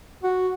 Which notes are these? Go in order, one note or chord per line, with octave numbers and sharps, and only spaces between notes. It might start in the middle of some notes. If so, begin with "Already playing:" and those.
F#4